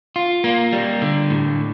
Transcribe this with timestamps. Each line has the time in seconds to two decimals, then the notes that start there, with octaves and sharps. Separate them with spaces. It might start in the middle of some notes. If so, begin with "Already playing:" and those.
0.16 F4
0.44 A#3
0.73 G3
1.02 D3
1.30 A2